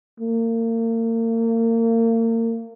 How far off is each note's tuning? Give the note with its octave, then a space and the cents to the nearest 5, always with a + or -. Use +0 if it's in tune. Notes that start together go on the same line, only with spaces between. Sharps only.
A#3 -35